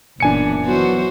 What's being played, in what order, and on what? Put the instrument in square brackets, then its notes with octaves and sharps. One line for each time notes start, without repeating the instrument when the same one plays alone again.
[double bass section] F#1 [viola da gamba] A#2 E3 B3 [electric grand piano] D4 G#5 C#7
[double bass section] E3 F#3 B3 [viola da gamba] F#4 C5